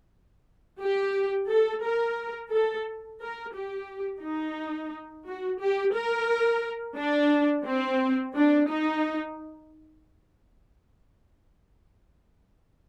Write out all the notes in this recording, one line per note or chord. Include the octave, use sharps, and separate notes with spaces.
G4
A4
A#4
A4
A#4
G4
D#4
F#4
G4
A#4
D4
C4
D4
D#4